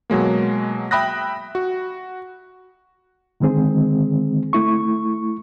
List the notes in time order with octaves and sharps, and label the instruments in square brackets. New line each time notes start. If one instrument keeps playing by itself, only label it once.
[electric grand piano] B2 F#3 G#3 A#3
E5 G5 B5 D#6 F#6 A#6
F#4
[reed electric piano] D3 D#3 G#3 C4 G#4
A3 E4 C#6